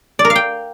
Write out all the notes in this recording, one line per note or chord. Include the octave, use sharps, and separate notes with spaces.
D5
A#4
F5
G5